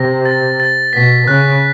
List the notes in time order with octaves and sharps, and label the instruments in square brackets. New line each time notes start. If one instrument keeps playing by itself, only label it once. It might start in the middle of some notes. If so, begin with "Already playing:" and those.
Already playing: [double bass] C3 [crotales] A#6
[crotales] A6
A6
[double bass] B2 [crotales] B6
[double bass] C#3 [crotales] F#6